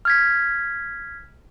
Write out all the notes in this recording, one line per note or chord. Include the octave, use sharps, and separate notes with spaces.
F6 G#6 B6